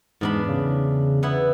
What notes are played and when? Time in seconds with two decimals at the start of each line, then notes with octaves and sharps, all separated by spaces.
0.21 E2 G#2 D4 B5
0.49 C#3
1.23 B3 E4 F#5